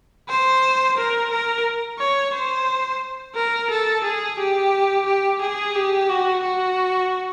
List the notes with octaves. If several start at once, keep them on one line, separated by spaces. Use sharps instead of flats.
C5
A#4
A#4
C#5
C5
A#4
A4
G#4
G4
G4
G#4
G4
F#4
F#4